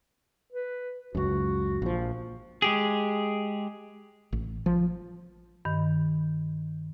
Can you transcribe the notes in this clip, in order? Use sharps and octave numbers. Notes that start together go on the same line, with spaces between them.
B4
C#2 F#2 F#4
A#1 F3
G#3 G4 G#4
A1
F3
G2 D#3